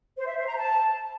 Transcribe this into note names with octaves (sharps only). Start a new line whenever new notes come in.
C5
E5
C5
A#5
A5